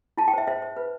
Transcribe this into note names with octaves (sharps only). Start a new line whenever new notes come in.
E4 A5
G5
C5 E5
C5 E5
C5
B4